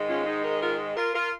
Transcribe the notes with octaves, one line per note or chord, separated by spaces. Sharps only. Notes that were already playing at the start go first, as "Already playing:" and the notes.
Already playing: G#2 D#3 G#3
C#4 F4
D#4 G#4
A#4 D#5
F4 A#4
F4 A#4
F4 A#4